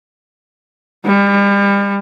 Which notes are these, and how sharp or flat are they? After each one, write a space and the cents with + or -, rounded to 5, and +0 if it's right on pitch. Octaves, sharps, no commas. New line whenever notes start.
G3 +35